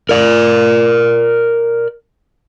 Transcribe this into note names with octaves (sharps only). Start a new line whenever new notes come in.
A#4 D5